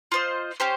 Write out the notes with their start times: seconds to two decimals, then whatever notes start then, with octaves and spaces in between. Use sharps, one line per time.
0.12 F4 C5 D#5
0.60 C#4 G4 C5